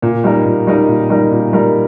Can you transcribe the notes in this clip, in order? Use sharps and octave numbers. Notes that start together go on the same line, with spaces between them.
A#2
G3 D#4 A#4
A#2
G3 D#4 A#4
A#2
G3 D#4 A#4
A#2
G3 D#4 A#4